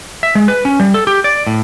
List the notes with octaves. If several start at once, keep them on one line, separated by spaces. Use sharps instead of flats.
E5
G#3
B4
C#4
G3
A4
G4
D5
A2